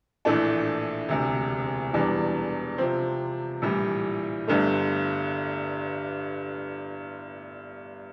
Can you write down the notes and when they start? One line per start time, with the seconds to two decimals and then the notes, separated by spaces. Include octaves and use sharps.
0.25 A#1 A2 E3 A3 D4
1.09 E1 D2 C3
1.93 E1 E2 E3 G3 D4
2.78 C3 F3 C4
3.62 A#1 A2 E3 G3
4.48 G1 G2 D3 A3